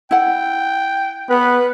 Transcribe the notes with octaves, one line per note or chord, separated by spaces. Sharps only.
E4 F#5 G5
B3 B4